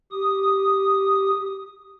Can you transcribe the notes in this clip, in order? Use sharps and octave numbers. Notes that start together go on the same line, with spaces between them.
G4 D#6